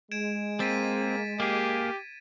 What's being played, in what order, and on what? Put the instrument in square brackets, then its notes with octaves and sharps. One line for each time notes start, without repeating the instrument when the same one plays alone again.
[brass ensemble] G#3 [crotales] G#6 D7 E7
[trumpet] A#3 [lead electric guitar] C4 [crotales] A6 B6 D#7
[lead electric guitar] A#3 G#4 [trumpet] G4